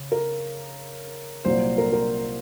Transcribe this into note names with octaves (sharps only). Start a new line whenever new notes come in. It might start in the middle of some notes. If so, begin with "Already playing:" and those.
Already playing: C#3
A#4
C2 A#2 F#3 C5
A#4
A#4